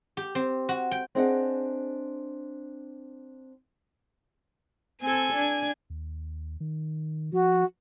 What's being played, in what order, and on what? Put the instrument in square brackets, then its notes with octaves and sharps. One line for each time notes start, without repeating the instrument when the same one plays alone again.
[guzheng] G4
C4
F#4
G5
[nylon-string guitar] C4 D4 G#4 D#5 E5 F#5
[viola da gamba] C4 A4 [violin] G#5 G#6
[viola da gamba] D4
[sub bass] D#2
D#3
[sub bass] F3 [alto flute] F#4